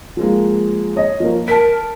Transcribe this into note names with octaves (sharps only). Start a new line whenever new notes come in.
F3 G#3 A#3
C#5 D#5
F3 A#3 A#4
A#4 A5 B6